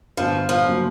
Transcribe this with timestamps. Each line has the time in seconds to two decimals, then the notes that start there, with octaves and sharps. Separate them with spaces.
0.17 G1 F3
0.49 F3
0.67 C#3 F#3 A#3